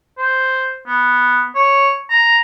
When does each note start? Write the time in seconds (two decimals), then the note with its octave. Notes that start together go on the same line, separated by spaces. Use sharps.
0.18 C5
0.87 B3
1.55 C#5
2.10 A#5